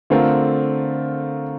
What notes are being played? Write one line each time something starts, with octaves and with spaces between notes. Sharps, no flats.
D3 A3 C4 F4 A#4